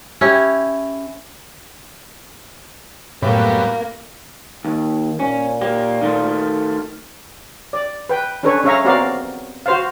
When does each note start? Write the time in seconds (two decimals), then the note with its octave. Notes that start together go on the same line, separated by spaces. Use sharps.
0.21 C#4 E4 G4
3.22 F#2 A2 G3 A#3 B3
4.65 D#2 D#3
5.20 A#2 C#4
5.61 A#3 G4
6.01 D#3 A3 F4
7.73 D5
8.10 B4 G5
8.43 C#4 D4 A4 B4 C#5
8.64 C#4 G#4 C#5 E5 F5 A#5
8.85 B3 C4 F#4 A#4 D5 F5
9.66 F#4 C5 F5